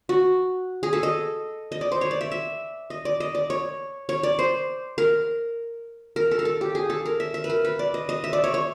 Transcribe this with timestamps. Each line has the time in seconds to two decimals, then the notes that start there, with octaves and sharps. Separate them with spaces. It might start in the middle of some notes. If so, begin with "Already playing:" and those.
0.09 F#4
0.83 G#4
0.93 A4
1.03 D#5
1.72 D#5
1.81 D5
1.92 C5
2.01 C#5
2.11 D5
2.21 E5
2.32 E5
2.90 D#5
3.05 D5
3.20 D#5
3.35 D5
3.50 C#5
4.09 C#5
4.23 D5
4.39 C5
4.98 A#4
6.16 A#4
6.31 A4
6.39 A#4
6.45 A4
6.61 G4
6.75 G#4
6.90 A4
7.06 A#4
7.20 E5
7.34 E5
7.44 B4
7.50 A#4
7.65 B4
7.79 D5
7.94 D#5
8.09 D#5
8.24 E5
8.33 D5
8.44 C#5
8.54 C#5